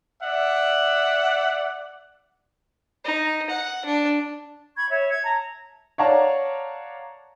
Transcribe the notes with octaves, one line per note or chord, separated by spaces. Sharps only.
D5 E5 F#5
D#4
F#5
D4
B5 C#6 G#6
C#5 E5
G#6
A5 A#5
C#5 D5 F5 F#5 A5 A#5